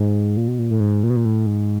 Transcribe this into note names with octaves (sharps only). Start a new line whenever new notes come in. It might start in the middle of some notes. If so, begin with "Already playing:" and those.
Already playing: G#2
A#2
B2
A#2
A2
G#2
A#2
B2
A#2
A2
G#2